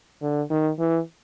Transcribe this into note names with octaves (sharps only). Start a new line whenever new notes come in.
D3
D#3
E3